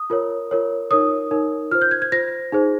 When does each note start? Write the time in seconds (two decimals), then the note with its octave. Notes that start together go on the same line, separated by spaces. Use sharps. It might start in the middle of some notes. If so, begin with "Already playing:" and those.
Already playing: D#6
0.10 F4 A#4 C#5
0.51 F4 A#4 C#5
0.91 D#4 A#4 C#5 D#6
1.31 D#4 A#4 C#5
1.72 F4 C5 F6
1.82 G6
1.91 G#6
2.02 G#6
2.12 F4 C5 A#6
2.52 D#4 G#4 C5